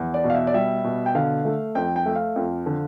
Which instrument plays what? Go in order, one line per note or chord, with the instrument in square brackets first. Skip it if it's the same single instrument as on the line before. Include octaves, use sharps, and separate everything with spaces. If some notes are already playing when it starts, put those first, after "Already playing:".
Already playing: [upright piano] E2
D5
B2
F5
E5
D5
G3 E5
B2
G5
D3 F5
A3
F2 G5
G5
A3 E5
F5
F2
D3